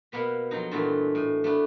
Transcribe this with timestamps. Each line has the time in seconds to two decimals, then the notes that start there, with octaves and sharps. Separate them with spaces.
0.12 B2 A#3 B3 B5
0.51 F2 F#3 D#4
0.71 G2 A#2 E3 A3 D#4 F#4
1.15 A2
1.44 A3 B3 D4